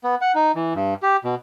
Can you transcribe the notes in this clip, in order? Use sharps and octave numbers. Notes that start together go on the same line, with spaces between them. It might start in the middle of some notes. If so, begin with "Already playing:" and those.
B3
F#5
D#4
E3
G2
G4
B2